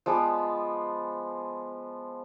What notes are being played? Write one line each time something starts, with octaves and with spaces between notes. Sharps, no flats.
F3 G#3 B3 D6